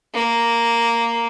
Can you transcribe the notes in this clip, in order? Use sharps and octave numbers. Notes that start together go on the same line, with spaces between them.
A#3